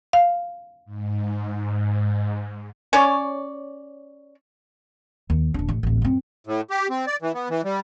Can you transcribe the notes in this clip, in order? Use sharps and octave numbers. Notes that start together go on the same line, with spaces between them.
F5
G#2
C#4 C#5 D5
D#2
D#1 D4
A1
D1 A1
F#2 C4
A2
G4
C4
D5
E3
B3
E3
G3